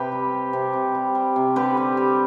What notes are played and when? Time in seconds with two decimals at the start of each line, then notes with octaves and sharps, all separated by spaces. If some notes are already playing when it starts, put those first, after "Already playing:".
Already playing: C3 G4 B4
0.12 G3
0.32 G3
0.53 C3
0.73 C3
0.95 G3
1.15 G3
1.36 C3
1.56 D3 G4 B4
1.77 G3
1.97 G3